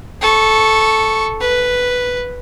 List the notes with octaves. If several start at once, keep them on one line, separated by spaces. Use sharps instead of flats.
A4 C#6
B4